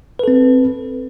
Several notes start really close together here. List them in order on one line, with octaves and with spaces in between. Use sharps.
B4 A4 C4